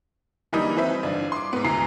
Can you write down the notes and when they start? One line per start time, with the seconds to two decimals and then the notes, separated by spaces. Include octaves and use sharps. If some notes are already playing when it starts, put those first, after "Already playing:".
0.53 D3 E3 F#3 G3 A#3 D#4
0.77 E3 C4 B4 E5
1.03 G1 D4
1.32 C6 D6
1.53 G#2 B3
1.64 D2 E3 B3 A#5 C7